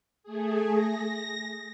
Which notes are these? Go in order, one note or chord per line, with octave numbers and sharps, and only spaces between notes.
A3 G#4
A#6